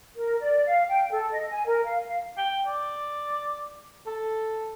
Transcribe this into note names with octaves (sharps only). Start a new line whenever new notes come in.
A#4
D5
F5
G5
A4
D#5
G#5
A#4
F5
F5
G5
D5
A4